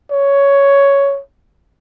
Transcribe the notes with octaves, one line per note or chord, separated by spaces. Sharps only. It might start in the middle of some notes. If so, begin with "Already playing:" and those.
C#5